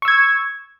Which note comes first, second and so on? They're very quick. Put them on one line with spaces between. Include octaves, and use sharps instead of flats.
C#6 E6 G#6